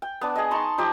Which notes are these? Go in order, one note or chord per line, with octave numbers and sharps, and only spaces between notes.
G5
B3 D4
G#4 D#5
D#4 A5 C6 C#6
F3 D#4 G4 D#5